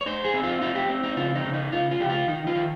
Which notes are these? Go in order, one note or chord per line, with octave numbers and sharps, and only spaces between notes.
C#5
D#4 C5
G#4
C4
F4
D#4 F4
G4
C4
D#4
C#3 F4
D#4
C#3
D#4
C#3 F4
F4
C#3 G4
F4
D#3 D#4
F4
D#3